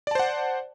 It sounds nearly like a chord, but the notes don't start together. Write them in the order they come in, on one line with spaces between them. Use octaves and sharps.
D5 A5 C5 F#5